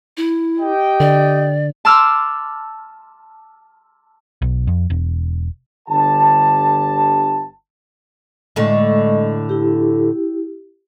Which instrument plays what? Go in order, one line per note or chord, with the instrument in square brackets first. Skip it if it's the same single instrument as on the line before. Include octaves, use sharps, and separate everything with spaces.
[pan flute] E4
[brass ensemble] G4 D#5 G5
[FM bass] D3 [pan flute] D5
[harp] A5 C6 D6 E6 F6
[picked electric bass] B1
F2
E1
[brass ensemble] G1 D3 G4 A5
[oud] A2 D3 [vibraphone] G#3 D#5 C#6
[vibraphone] E4 G4